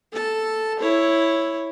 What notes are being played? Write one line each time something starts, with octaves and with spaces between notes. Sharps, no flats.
A4 A5
E4 C#5